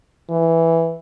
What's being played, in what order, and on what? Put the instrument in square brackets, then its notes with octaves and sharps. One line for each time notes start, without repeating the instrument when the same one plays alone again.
[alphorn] E3